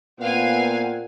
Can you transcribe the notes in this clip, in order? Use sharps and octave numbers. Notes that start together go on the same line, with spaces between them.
A#2 B3 C4 F5 F#5 G#5